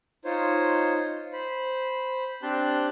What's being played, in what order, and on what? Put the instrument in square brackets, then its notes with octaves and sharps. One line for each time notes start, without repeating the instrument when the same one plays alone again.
[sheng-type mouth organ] D#4 F4 C5 C#5
C5 B5
C4 D4 G4 A5 C6 F#6